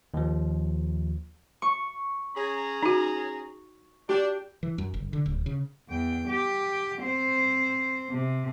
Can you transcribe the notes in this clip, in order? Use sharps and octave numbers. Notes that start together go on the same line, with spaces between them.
D#2 F3
C#6
C#4 G#4 A#5
D#4 F#4
D4 G4
E3
F#2
F#1
D3
D1
C#3
E2 G5
G4 G5
C4 C5
C3